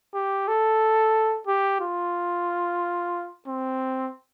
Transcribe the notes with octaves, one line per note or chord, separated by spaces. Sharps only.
G4
A4
G4
F4
C4